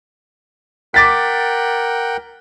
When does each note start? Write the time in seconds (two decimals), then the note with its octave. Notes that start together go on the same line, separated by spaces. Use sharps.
0.94 A#4 F#5 G5 D6 A6 B6